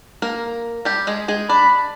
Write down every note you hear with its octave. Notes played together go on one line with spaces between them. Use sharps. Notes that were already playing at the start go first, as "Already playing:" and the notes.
A#3 A#4
G3 G4
G#3 G#4
G#3 G#4
D4 D5 B5